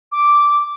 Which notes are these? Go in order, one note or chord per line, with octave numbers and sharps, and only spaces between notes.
D6